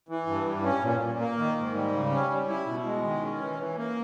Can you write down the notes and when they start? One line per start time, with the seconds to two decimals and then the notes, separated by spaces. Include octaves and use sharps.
0.09 E3
0.26 G2
0.45 G3
0.64 C#4
0.81 A#2
1.00 A#2
1.19 A#3
1.37 D#3
1.56 G#2
1.74 G3
1.93 C#3
2.11 C#4
2.29 G3
2.48 E4
2.66 B2
2.85 G#3
3.03 D#3
3.22 C#4
3.40 E3
3.59 E3
3.77 A#3